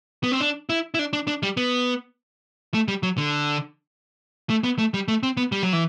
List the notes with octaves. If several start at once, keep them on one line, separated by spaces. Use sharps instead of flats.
B3
C4
D4
E4
E4
D4
D4
D4
G3
B3
A3
G3
F#3
D3
A3
B3
A3
G3
A3
C4
B3
G3
F#3
E3